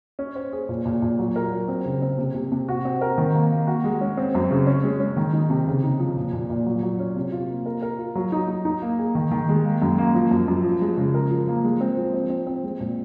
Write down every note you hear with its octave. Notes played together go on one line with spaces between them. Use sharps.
C#4
C5
G#4
A#2
A#2
A#2
F#3
A#4
F#3
C4
C#3
C4
C3
C3
C3
F#4
C4
A#4
D#3
A#3
A#3
F#4
G#3
C#4
C4
F#2
C#3
C#4
G#3
C#4
D#3
D#4
C3
C#3
D#4
F3
A#2
A#2
A#2
F#3
F#3
C#4
C3
F4
A#3
A#4
A#4
F4
F#3
D#4
D#4
D#4
A#3
G#4
D#3
D#3
G#3
A#3
F#2
A#3
F3
F#2
F#2
F3
G#3
C#3
A#4
F3
A#3
G#3
C4
F3
C4
C4
C4
G#3
A#2